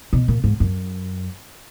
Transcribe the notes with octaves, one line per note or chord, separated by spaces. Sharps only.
B2
A#2
G#2
F#2